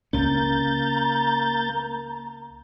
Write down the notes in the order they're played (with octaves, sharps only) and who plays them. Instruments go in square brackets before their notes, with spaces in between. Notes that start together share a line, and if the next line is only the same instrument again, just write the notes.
[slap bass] C#2 C#4 [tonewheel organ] A#3 G6 A6 [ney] A#5